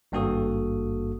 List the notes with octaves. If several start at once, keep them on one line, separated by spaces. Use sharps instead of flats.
G#1 G2 A#3 F#4 A4 D#6